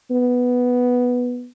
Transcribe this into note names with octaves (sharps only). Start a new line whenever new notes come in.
B3